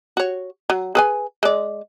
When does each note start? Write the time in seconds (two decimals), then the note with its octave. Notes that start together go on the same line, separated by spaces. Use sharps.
0.17 F#4 C#5
0.70 F#3
0.95 G#4 B4 G#5
1.43 G#3 D5